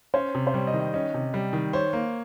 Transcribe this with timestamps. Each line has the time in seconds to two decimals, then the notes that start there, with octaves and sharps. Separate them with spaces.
0.14 C#4 C5
0.35 C3
0.47 C5
0.54 G3 C#5
0.67 D#5
0.74 D#3
0.80 D#5
0.94 C#4 D#5
1.14 C3
1.34 G3
1.53 D#3
1.73 C5 C#5
1.93 A#3